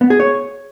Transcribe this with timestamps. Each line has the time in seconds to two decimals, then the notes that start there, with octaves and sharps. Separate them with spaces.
0.01 B3
0.10 G#4
0.20 C#5